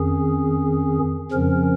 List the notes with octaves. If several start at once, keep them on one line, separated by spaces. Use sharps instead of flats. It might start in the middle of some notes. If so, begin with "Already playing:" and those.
Already playing: F2 D#3 C#4 G#4
F2 C#3 F3 C#4 A#4